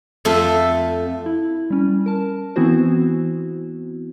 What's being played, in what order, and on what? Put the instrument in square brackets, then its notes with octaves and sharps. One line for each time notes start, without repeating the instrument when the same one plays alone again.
[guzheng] F2 A3 F4 A4 E5
[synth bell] E4
G3 C#4
A#4 A5
E3 B3 C4 E4 F#4 C5